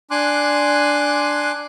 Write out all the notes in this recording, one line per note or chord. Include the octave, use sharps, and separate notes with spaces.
D4 G#5 C6 D6 F#6